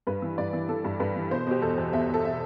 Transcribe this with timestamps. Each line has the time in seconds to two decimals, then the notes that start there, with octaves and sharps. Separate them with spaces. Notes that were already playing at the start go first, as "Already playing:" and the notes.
0.07 G2 B4
0.22 E3
0.38 G2 D5
0.53 E3
0.69 E3 A4
0.84 G2
1.00 G2 B4
1.16 E3
1.31 B2 C5
1.47 B2 G4
1.62 E2 A4
1.78 E2
1.93 E2 E5
2.09 E2 A4
2.24 B2 E5